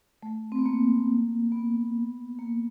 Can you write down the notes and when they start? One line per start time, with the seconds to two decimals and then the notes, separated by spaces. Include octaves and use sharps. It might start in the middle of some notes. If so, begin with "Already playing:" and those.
0.23 A3
0.52 C4
0.59 B3
0.66 A#3
1.52 B3
2.39 A#3